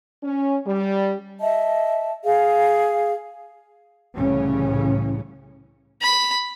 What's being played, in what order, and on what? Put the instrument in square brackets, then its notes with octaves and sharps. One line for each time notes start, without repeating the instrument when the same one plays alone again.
[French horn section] C#4
G3
[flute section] D#5 E5 A5
G#4 F5
[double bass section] C2 A2 C#3 E3 C#4
[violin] B5